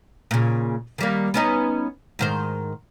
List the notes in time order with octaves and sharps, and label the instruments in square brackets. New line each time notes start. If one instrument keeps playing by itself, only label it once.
[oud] A#2 C#3
D#3 G3 A#3
B3 C#4 D#4
G#2 D#3 C5